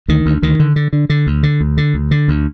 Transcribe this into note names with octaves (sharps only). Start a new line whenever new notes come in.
D2 D#3
D2
D2 D#3
D3
D3
D3
D3
D2
D3
D2
D3
D2
D3
D2